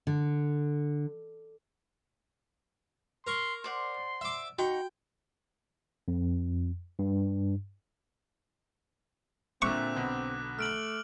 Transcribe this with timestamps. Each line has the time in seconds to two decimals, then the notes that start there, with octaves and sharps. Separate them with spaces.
0.07 D3
3.27 A#4 C6 C#6
3.64 C5 D5 F#5 C6
4.21 E5 D6
4.58 D#4 F#4 F#5 G5 C#6
6.08 F2
6.99 G2
9.62 A#2 D3 C4 E5 C#6 D6 F#6
9.96 B1 B2 D3
10.59 A3 F6 D7 F#7